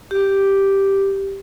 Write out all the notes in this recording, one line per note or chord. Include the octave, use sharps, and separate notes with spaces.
G4